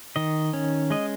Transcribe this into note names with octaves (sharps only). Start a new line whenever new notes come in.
D#3 D#5
C#4
G#3 D#5